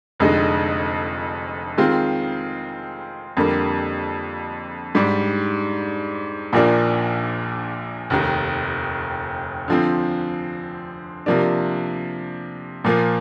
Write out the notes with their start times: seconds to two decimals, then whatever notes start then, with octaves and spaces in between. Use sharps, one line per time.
0.20 F1 F2 D3 G#3 D#4
1.77 D#3 G#3 C4 F4
3.37 F2 D3 G3 A#3
4.95 G#2 G3 D4
6.53 A#1 A#2 F3 A#3 D4
8.10 F1 D#2 D#3
9.68 D3 F3 C4
11.26 C3 F3 A#3 D4
12.84 A#2 F3 A#3